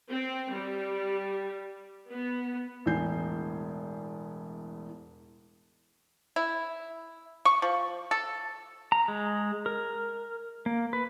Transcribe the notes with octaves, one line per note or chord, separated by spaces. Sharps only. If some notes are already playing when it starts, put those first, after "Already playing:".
C4
G3
B3
E1 E2 A2 G#5 G6 C7
E4
C#6
F3
A4
A#5
G#3
A#4
A#3
B4